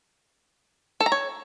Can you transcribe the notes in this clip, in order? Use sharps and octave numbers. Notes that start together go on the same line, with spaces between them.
A4
A#5
C#5